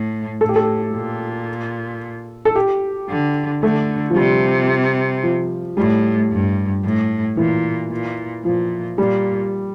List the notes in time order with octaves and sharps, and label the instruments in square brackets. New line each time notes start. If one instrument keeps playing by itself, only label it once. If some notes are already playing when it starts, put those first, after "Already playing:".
Already playing: [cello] A2
[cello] A2 [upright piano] A4
[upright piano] G4
A4
[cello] A#2
[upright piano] A4
G4
[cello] D3
[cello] D3 [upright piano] A3
[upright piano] F3
[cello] C3 [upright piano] G3
[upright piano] F3
[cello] A2 [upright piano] G3
[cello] G2
A2
[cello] A#2 [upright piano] E3
[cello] A#2
[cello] A#2 [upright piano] F3
[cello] A#2 [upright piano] G3